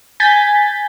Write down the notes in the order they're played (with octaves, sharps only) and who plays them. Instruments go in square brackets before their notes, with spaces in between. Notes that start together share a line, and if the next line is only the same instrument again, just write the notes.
[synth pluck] G#5 G6 A6 B6